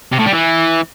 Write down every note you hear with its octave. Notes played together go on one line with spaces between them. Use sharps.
C3
A2
G3
E3